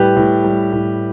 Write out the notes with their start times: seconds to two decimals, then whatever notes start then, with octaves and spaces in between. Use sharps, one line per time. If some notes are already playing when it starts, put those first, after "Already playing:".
Already playing: A2 G3 G4 B4
0.17 A2
0.45 G3
0.73 A2